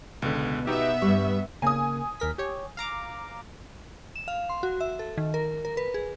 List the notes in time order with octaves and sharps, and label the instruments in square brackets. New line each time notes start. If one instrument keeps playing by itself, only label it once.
[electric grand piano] C#2 D3 [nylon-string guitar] B2
[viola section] B3 E5 [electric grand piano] D#4 F#4 G4
[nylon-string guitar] G2 G3 [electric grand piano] C#6
[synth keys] C#3 A#3 [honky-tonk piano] G#5 D#6
[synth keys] D#2 A#4 B6
G4 C#5
F5 A#5 D6
[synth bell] E7
F5
C6
F#4
E5
A4
D#3
A#4
A#4
B4
G#4